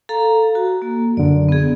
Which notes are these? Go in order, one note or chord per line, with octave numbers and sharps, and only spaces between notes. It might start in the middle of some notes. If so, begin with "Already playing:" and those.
A4 F5 A#5
F#4
A#3
F#2 D3 D5
B3 G#4